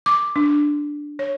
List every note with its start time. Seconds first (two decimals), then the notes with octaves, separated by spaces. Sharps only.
0.06 D6
0.36 D4
1.19 C#5